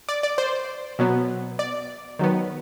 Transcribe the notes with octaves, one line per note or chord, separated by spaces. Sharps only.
D5
D5
C5
B2 F#3 B3
D5
D#3 F#3 B3